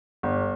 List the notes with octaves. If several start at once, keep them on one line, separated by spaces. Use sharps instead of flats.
G1